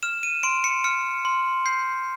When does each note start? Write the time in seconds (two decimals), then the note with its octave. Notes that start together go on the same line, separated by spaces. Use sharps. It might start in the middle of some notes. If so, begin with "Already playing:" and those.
0.03 F6 E7
0.23 D#7
0.43 C6 D7
0.64 C#7
0.84 F6 C#7
1.25 C6
1.66 G6 C7